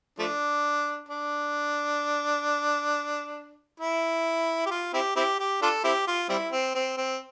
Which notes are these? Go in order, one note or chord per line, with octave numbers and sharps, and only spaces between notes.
F3 A3 D4
D4
E4
G4
F4
C4 E4 G4
C4 E4 G4
G4
D4 F4 A4
C4 E4 G4
F4
G3 C4 E4
C4
C4
C4